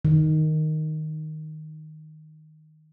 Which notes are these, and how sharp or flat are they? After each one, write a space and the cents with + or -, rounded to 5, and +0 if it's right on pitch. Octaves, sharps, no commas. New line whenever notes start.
D#3 -5